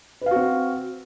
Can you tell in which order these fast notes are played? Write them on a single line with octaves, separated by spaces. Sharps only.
B4 F5 F#4 C4